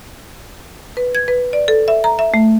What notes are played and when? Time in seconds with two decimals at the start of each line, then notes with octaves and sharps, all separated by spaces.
0.97 B4
1.15 G#6
1.28 B4
1.53 D5
1.68 A4
1.88 E5
2.04 A#5
2.19 E5
2.34 A3